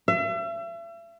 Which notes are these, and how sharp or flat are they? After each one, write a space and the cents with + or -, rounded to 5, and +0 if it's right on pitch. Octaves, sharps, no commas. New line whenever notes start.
E5 +40